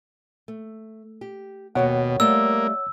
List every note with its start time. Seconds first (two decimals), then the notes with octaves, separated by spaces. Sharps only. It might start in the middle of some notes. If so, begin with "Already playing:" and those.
0.48 A3
1.21 G4
1.75 D#2 B2 F#4 C#5 F#5 G5
2.20 G3 A3 A#3 F5 E6